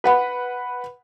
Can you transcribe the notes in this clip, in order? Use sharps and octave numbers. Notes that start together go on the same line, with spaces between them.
B4 F#5 B5